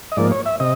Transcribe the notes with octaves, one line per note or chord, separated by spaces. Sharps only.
D#5
G#2 F3 A#3 D5
C#5
E5
C3 D#5